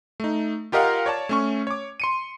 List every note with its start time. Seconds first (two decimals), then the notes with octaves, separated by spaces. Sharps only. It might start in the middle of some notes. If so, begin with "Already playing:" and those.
0.20 A3 D#4
0.72 F4 G4 A#4 D#5 F5 F#5
1.06 C#5 D5 A5
1.29 A3 C#4 C#6
1.67 C#5 D6
2.00 C6 C#7 D#7